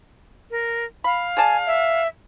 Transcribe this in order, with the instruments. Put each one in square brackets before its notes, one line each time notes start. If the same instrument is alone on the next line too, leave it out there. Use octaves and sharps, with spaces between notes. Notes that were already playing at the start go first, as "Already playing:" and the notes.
[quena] A#4
[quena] F5 [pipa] B5
[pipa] G#4 D5 A5 [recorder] G#5
[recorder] E5